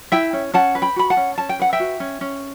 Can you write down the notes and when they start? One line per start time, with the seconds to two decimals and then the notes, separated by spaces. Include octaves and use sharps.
0.12 E4 E5 G5
0.33 C#4
0.54 C#4 F#5 A5
0.75 B4
0.82 G5 B5
0.96 F#4 B5
1.10 F#5 A5
1.17 C#4
1.38 C#4 A5
1.49 G5
1.59 B4 F#5
1.73 E5 G5
1.80 F#4
2.00 C#4
2.21 C#4